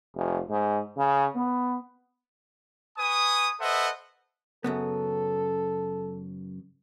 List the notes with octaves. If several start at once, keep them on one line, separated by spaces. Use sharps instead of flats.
F1
G#2
C#3
B3
B4 G#5 C#6 D#6
A4 B4 C5 D#5 E5 F#5
F#2 C#3 B3 A4